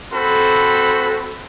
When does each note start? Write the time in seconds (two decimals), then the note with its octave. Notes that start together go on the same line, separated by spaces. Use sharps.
0.13 C4 F#4 A4 C5 B5